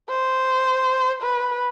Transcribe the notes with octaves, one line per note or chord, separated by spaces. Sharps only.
C5
B4